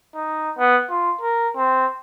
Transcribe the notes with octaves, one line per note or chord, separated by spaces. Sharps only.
D#4
B3
F4
A#4
C4